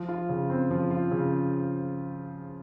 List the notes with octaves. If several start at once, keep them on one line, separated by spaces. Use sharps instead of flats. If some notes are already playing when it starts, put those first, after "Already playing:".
Already playing: F3
F4
C#3
C4
F3
F4
C#3